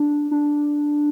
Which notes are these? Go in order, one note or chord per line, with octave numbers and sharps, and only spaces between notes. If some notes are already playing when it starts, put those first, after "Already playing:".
Already playing: D4
D4